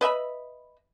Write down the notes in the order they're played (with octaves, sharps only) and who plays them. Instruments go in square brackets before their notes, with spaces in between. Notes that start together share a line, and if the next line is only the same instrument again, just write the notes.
[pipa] B4 D#5 E5 B5